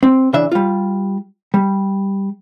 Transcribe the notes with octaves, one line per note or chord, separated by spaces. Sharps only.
C4
C#3 E3 D4 E5
G3 F4
G3